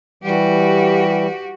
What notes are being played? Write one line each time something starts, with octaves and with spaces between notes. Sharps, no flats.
E3 G3 F#4 G4